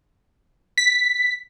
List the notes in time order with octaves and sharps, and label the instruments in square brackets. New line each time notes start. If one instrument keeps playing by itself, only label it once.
[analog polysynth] B6